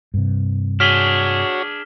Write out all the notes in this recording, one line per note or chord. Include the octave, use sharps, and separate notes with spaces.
G2 C3
D4 F#4 G#4 C#5 F6 B6 G7